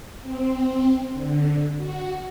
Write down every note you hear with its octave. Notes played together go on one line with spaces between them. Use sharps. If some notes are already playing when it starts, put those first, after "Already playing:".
C4
D3
F#4